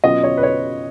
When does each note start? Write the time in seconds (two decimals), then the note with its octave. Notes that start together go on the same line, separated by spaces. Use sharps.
0.04 B2 F#3 C#4 F4 D#5
0.24 C#5
0.37 B4
0.43 C#5